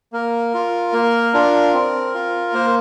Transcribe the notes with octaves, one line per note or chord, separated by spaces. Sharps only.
A#3 A#4
F4
A#3
D4 F4
C4
F4
A#3 C5